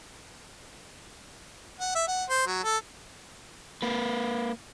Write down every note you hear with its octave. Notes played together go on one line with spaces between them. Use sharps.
F#5
E5
F#5
C5
F#3
A4
A#3 B4